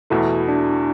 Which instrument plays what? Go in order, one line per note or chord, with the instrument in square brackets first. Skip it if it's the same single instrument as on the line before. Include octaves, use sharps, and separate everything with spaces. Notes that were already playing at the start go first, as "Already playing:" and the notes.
[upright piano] E2 B2 A3 [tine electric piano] E4
[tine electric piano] D4